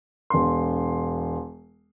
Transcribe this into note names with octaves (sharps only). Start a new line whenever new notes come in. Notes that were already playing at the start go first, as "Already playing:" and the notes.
E1 C6